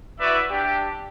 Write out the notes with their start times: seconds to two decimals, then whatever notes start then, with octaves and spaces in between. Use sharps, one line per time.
0.20 E4 F#4 B4 D5 E5
0.51 D4 G4